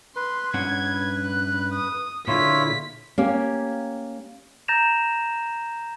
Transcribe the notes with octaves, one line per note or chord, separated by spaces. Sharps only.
B4 C6
G2 C#4 F#5 G#6
F#6
D#6
A#2 D3 E4 F4 C#5 B6
A#3 C#4 G4
A#5 G6 A6 A#6 E7 F7